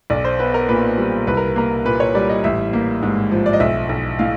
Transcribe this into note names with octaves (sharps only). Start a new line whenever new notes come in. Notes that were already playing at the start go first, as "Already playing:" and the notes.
B1 D5
C5
B3 B4
A#4
A#2 B4
G3
C2 B4
A#4
A#3 A#4
A#2 B4
C#5
G3 D5
D#5
A1 E5
A#3
G#2
F3
D5
D#5
B1 E5
B1
A2 F5